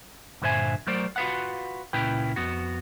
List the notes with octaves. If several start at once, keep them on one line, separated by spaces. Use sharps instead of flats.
G2 A#2 D3 C5 E5 G#5
F#3 A3 A#4 C5 D5
F4 F#4 A#4 B4 F5 F#5
C#2 A#2 C#4 E4 B4 G5
F2 B3 F#4